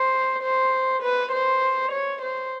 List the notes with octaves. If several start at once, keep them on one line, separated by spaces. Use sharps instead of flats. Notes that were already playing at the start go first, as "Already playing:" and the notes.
Already playing: C5
C5
B4
C5
C#5
C5